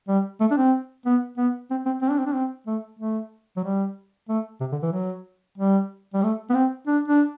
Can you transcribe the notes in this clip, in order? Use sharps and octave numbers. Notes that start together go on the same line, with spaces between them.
G3
A3
D4
C4
B3
B3
C4
C4
C4
D4
C4
D4
C4
A3
A3
F#3
G3
A3
C3
D3
E3
F#3
G3
G3
A3
B3
C4
D4
D4